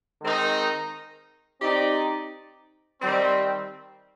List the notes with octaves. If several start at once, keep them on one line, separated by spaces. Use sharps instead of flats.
D#3 G#3 C4 D#4 A#4
C4 D#4 G4 D5
D#3 G3 C4